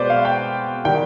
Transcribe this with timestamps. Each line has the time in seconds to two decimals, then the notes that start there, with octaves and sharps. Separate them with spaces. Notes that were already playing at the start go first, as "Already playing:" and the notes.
Already playing: B2 G#3 B4 C5 D5
0.10 F5
0.25 G5
0.85 D#3 G3 G5